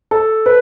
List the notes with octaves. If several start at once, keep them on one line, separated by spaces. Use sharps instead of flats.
A4
B4